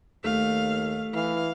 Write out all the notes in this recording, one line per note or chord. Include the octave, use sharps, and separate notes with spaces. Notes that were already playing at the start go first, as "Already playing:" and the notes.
D#2 A3 F5
E3 F5